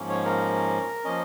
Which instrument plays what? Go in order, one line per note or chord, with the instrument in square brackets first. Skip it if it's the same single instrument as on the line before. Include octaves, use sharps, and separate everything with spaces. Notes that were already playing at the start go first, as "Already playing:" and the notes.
Already playing: [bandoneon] G#2 F3 A#3 C#4
C#5
A#4
F3 A#3 C#4 D#5